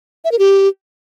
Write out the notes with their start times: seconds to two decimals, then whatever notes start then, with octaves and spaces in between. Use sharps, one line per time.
0.25 E5
0.32 A#4
0.39 G4